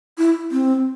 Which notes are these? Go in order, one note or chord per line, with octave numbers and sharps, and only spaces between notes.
E4
C4